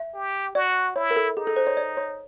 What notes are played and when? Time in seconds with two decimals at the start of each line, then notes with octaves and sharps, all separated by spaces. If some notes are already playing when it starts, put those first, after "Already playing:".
Already playing: E5
0.14 G4
0.55 F#4 D5
0.96 E4 C#5
1.11 A#4
1.16 A4
1.37 D#4 G#4
1.47 A4
1.56 C5
1.67 C#5
1.77 D5
1.97 C#5